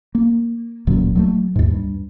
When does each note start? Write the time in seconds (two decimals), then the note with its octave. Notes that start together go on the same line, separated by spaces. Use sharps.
0.15 A#3
0.87 D1 C#2 A#2 F#3
1.15 F#3 G#3 A3
1.56 D#2 G#2
1.71 G2